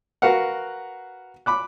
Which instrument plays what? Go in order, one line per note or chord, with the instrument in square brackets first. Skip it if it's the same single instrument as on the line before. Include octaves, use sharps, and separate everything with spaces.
[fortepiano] F#4 A#4 B4 F5 F#5
B5 D6 F#6